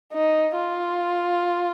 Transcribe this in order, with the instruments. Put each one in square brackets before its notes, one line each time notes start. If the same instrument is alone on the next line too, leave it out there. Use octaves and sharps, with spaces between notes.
[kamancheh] D#4
F4